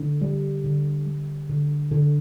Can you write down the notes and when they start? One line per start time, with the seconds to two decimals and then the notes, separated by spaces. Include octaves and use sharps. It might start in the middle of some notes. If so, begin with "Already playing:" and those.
Already playing: D3
0.22 G3
0.64 D3
1.06 G3
1.49 D3
1.91 D3